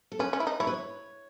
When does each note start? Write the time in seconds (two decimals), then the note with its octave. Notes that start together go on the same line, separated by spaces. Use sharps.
0.12 A4
0.19 C#4 B4
0.33 C#4
0.40 E4
0.47 D#4
0.60 E4 C#5
0.67 B4
0.74 C#5